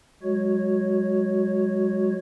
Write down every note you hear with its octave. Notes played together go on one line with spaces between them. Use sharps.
F#3 G#3 F#4 C#5